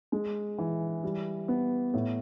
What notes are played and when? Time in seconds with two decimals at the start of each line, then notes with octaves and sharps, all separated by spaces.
0.12 G#3
0.58 E3
1.03 G3
1.48 B3
1.94 A2